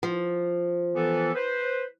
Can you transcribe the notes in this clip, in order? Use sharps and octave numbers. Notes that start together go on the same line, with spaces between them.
F3
E3 B3 A4
B4 C5